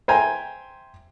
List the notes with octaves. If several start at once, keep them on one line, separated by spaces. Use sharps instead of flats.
C5 E5 G5 G#5 A#5